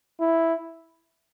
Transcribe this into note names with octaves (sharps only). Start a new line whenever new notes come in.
E4